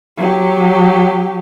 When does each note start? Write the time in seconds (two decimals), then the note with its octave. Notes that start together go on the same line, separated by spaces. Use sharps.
0.17 F#3 G4